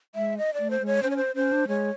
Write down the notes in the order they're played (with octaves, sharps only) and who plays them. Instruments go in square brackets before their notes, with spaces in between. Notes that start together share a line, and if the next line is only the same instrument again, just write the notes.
[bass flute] G#3 [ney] E5
[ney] D#5
D5
[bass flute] A3
[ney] C5
[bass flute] G#3
[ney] C#5
[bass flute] C#4 [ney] C5
[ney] C#5
C5
[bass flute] C#4 [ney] C5
[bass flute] D4
[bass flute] G#3 [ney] C#5